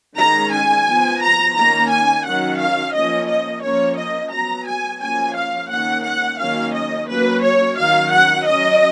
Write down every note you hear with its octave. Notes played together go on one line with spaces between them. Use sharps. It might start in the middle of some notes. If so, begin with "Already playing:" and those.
D#3 G#3 C#4 A#5
G#5
F3 B3
A#5
D#3 A#3 C#4 A#5
G#5
D#3 F#3 C#4 F#5
F5
F3 A#3 C#4 D#5
D#5
F3 A#3 C#4 C#5
D#5
F#3 B3 A#5
G#5
F3 A#3 C#4 G#5
F5
D#3 A#3 C#4 F#5
F#5
D#3 F#3 A#3 C#4 F5
D#5
F#3 A#3 C#4 B4
C#5
D#3 F#3 C#4 F5
F#5
F#3 C#4 D#5